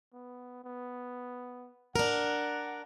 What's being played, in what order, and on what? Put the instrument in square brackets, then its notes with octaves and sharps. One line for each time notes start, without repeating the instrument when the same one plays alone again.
[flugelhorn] B3
B3
[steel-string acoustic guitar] D4 A#4 [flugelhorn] F#5